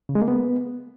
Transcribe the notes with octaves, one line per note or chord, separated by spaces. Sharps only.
C#3
G#3
A#3
B3